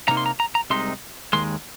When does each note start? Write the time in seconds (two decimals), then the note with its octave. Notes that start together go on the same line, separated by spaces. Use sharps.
0.08 C3 F3 A#3 D#4 A#5
0.17 C6
0.26 A#5
0.40 A#5
0.55 A#5
0.70 C2 C3 G#3 D#4 C6
1.33 D#2 D#3 G#3 C6